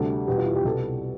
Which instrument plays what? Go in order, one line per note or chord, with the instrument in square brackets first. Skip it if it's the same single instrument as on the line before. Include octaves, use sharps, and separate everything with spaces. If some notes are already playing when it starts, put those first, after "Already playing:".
Already playing: [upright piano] D2 C3 G3 A4
E2 B2 G3 G4
F4
E4
G4
C2 B2 G3 A4